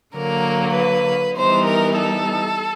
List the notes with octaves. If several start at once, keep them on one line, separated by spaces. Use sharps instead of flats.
D3 F#3 A#3 A#4
B4
E3 G3 B3 D#4 C5
A#4
A4